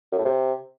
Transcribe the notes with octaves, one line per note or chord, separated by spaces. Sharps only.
F#2
A2
C3